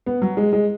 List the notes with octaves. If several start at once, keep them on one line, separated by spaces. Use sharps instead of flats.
B3
F#3
G#3
G#3